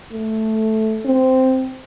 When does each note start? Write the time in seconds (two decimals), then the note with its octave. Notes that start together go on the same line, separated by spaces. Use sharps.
0.12 A3
1.05 C4